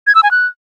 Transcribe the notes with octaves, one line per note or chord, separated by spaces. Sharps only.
G#6
E6
G#5
F#6